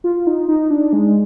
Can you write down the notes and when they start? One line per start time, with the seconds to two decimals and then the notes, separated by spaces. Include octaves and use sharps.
0.04 F4
0.27 D#4
0.48 D#4
0.70 D4
0.93 G#3